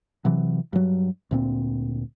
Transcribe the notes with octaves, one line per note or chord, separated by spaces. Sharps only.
C3 E3 F#3
G2 F#3
D2 A#2 C4